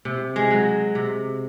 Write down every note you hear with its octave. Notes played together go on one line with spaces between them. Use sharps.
C3
G#3
F#3
C3